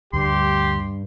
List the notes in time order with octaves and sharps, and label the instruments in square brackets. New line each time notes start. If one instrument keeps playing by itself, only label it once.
[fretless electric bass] D2 [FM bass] G2 [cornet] G4 [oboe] C6